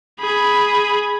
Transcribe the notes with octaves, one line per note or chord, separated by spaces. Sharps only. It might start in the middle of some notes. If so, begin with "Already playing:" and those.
G#4 B5